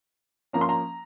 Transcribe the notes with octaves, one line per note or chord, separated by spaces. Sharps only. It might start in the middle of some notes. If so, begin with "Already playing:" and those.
F3 A#3 C#4 A#5
C6
A#5